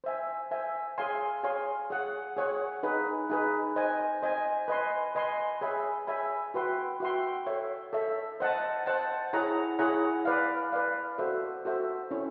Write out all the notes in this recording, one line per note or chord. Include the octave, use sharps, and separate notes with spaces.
C5 E5 G#5
C5 E5 G#5
G#4 C#5 F5 G#5 C6
G#4 C#5 F5 G#5 C6
G#4 C#5 F#5
G#4 C#5 F#5
D#4 G#4 B4
D#4 G#4 B4
C5 D#5 G#5
C5 D#5 G#5
B4 D#5 G#5 C6
B4 D#5 G#5 C6
G#4 C#5 E5 G#5 B5
G#4 C#5 E5 G#5 B5
F#4 B4 E5 G5 C6
F#4 B4 E5 G5 C6
A4 C#5 E5
A4 C#5 E5
C5 D#5 F#5 A5
C5 D#5 F#5 A5
E4 G#4 C#5 F#5 A#5
E4 G#4 C#5 F#5 A#5
B4 D5 F5
B4 D5 F5
F#4 A4 C5 E5
F#4 A4 C5 E5
C#4 E4 A4 C#5